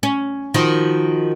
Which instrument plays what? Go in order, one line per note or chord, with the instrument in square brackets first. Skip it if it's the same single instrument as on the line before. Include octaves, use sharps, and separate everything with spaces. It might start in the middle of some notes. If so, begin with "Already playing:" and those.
[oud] C#4
[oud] D#3 [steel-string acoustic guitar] F3 F#4